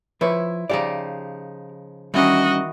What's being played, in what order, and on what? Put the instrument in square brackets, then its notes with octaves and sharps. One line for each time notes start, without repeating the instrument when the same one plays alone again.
[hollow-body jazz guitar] F3 B4 C#5 [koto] E4
[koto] C#3 F3 D#4 [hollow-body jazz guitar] G4 D5
[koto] D#3 E3 [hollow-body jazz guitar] G3 C#4 D4 [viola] F#4 D#5